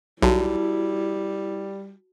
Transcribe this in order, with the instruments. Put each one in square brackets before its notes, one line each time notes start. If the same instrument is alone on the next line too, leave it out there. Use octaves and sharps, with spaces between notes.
[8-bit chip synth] B1 [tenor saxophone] G3 [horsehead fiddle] E4 [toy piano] F#4 A5